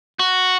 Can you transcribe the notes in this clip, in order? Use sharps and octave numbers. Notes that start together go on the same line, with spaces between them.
F#4